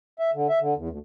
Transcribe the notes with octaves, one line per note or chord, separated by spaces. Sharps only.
E5
D3
E5
D3
E2
D2